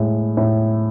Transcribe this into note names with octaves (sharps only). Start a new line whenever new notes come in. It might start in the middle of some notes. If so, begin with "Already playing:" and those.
Already playing: A2 G#3
A2